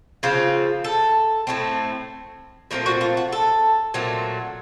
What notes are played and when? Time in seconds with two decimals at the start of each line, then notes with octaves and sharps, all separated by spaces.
0.23 C#3 F3 C4 F4
0.84 A4
1.47 A2 A3 C4
2.71 A#2 F3 A3 C4 A#4
2.86 F#4
3.01 F4
3.17 F#4
3.32 A4
3.94 A#2 F#3 A3 C4